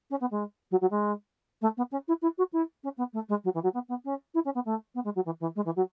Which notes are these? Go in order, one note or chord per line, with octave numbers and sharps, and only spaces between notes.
C#4
B3
G#3
F#3
F#3
G#3
A3
B3
C#4
E4
E4
F#4
E4
C#4
B3
A3
G#3
F#3
E3
F#3
B3
B3
C#4
E4
C#4
B3
A3
B3
G#3
F#3
E3
E3
G#3
E3
F#3